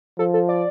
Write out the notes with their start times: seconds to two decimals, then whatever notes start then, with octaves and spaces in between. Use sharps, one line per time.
0.18 F3 A4
0.34 A4
0.49 D5